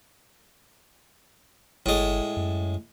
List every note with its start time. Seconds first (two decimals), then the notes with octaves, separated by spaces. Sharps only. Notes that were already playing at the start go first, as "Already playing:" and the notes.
1.86 G1 A2 G#3
2.36 F#2